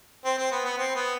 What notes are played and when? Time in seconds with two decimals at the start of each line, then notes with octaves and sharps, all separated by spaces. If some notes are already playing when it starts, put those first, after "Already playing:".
0.25 C4
0.38 C4
0.51 B3
0.65 B3
0.78 C4
0.95 B3